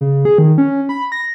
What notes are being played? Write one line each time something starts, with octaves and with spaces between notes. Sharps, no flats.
C#3
G#4
D#3
C#4
B5
A#6